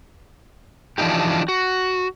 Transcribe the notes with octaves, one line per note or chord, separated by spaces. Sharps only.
E3 F3 D4 D#4 G4
F#4